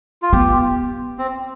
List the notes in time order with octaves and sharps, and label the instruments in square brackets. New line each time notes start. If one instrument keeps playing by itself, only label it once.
[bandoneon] F4
[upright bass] B3 [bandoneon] G4
[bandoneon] C4